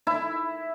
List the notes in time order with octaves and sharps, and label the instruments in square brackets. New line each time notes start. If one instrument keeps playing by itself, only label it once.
[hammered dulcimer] E4